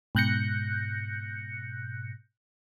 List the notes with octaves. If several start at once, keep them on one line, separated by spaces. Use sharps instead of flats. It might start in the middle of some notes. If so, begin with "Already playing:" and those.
G#2 B2 F#6 G6 A#6 C#7